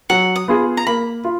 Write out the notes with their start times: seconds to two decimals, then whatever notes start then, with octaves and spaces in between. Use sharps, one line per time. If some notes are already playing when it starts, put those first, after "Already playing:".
0.10 F#3 F#5
0.36 D#6
0.48 B3 F4 G#4
0.77 A#5
0.87 A#3 B5
1.25 F4